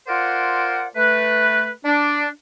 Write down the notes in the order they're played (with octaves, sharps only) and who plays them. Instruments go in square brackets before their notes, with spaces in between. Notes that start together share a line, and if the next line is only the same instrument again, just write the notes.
[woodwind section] F4 A#4 C5 D5 F#5
A3 B4
D4